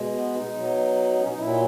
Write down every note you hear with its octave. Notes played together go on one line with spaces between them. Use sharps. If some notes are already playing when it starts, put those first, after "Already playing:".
Already playing: B2 G#3
B3
D#4
B2 F#3
B3
C#4
D#4
A#2 F#3 E4